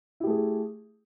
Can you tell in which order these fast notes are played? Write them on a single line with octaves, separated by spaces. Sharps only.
E4 G4 A3 G#4